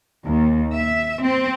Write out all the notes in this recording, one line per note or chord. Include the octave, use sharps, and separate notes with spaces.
D#2
E5
C4